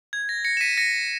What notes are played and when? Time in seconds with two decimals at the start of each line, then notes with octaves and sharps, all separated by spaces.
0.13 G#6
0.29 A#6
0.45 A#6 C#7
0.57 E7
0.61 B6 D#7
0.77 A#6 C#7